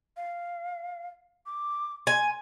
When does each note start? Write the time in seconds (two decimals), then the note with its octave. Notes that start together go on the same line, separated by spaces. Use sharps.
0.17 F5
1.46 D6
2.07 G#5 C6